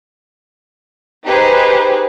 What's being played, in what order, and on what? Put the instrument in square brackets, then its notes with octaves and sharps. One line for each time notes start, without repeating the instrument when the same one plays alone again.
[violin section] D#4 G4 G#4 B4 C5